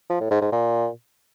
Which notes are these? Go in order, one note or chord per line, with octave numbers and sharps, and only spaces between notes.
F3
A2
G#2
G#2
A#2